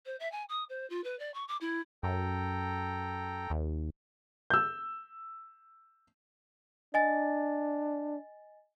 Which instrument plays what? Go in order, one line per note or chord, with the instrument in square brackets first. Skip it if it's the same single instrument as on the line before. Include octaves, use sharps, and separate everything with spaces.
[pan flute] C5
E5
G#5
D#6
C5
F4
B4
D5
C#6
D6
E4
[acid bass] F#2 [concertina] A4 G5 A#5
[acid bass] D#2
[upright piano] E6 G6
[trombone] D4 [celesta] D#5 G#5 A6